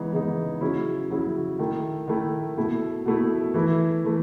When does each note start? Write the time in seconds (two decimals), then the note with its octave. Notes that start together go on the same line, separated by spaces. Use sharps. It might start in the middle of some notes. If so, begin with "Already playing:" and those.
Already playing: C#3 E3 G#3 B3 D#4
0.12 C#3 E3 G#3 B3 D#4
0.61 C#3 F#3 C#4 E4
1.10 C#3 F#3 C#4 E4
1.59 D#3 A3 E4
2.08 D#3 A3 E4
2.57 B2 A3 E4
3.06 B2 A3 E4
3.54 E3 A3 E4
4.04 E3 A3